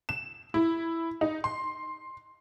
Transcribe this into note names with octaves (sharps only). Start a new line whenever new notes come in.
E7
E4
D#4
C6